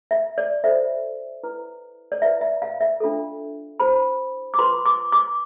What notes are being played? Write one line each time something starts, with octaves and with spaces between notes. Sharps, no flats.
E5
D5
F4 A4 C5 E5
E4 B4
D5
E4 B4 E5
E5
F5
E5
D4 F4 A4
E4 G4 C5 B5
D6
F4 B4 C6
D6
D6